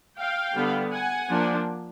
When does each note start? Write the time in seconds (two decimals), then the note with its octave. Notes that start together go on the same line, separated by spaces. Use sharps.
0.18 F5 G5
0.55 D3 G3 B3
0.91 F#5 G#5
1.29 F3 A#3 D4